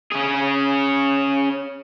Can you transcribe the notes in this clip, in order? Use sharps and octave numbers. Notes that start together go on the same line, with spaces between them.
C#4 G#4